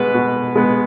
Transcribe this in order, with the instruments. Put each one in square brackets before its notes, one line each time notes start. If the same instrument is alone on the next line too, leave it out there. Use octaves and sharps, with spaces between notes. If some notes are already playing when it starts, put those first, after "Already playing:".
Already playing: [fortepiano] B2 G#3 B3 B4
B2
G#3 B3